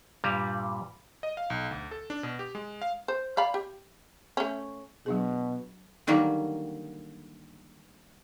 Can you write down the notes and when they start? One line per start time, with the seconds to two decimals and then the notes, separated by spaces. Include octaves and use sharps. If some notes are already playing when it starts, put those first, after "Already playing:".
0.24 G2 A#2 G3
1.23 D#5
1.37 F5
1.50 B1
1.71 D2
1.91 A4
2.10 D4
2.23 B2
2.39 G4
2.55 G#3
2.82 F5
3.08 C5
3.37 D5 F5 B5
3.54 G4
4.37 A3 C#4
5.06 B2 F#3 D4 G#4
6.07 D3 D#3 F#3 G3 A#3